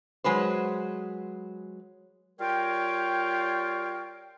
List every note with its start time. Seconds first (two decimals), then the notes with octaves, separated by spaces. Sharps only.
0.24 F#3 G#3 B4 C5
2.40 G3 F4 A#4 C#5 F5 G5